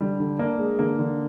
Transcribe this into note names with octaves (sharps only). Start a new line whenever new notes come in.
D3 G3
D3
A#3 D4
G#3
D3 A#3
D3